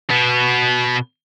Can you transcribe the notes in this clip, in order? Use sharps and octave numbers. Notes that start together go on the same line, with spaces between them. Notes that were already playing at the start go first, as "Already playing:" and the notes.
B2 B3